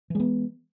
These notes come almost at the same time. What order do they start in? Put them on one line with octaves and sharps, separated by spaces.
E3 G#3 B3